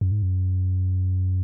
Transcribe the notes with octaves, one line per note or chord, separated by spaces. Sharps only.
F#2
G#2
F#2